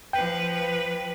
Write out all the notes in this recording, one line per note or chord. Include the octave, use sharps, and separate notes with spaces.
F3 B4 G5